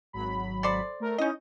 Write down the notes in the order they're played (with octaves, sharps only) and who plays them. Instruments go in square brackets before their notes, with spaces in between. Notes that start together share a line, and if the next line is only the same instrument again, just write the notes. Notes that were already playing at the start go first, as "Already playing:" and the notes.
[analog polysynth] G#1 F#3 B5
[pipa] A4 C5 D5
[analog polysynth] A3 A#4
[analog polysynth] C#4 E4 [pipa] D#4 D#5